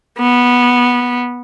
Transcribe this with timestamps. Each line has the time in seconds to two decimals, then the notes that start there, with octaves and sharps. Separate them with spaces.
0.19 B3